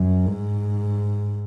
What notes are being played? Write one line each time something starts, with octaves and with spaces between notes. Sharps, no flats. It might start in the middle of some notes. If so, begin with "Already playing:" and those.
Already playing: F#2
G#2